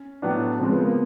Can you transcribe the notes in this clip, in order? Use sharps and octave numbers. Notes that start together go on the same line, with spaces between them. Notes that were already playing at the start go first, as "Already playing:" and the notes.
Already playing: C#4
A2 F#3 B3 D4
C#3 F3 G#3 C4
B3
A#3